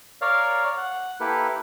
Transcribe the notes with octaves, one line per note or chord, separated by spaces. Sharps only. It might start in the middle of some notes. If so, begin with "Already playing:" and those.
A#4 C#5 D5 F5
F#5
A#3 E4 G4 A4 B4